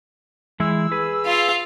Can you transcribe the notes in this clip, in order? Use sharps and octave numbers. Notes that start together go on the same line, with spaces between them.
E3 G#3 E4 E6
G#4 B4
F4 F5